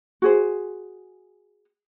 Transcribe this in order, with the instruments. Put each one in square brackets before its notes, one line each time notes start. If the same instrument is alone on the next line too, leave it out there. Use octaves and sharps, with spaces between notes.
[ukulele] F#4 G#4 C5